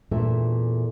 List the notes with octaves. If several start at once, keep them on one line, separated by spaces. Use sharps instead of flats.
E2 A#2 A3 D4 E5